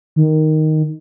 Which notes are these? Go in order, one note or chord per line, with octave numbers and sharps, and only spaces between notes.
D#3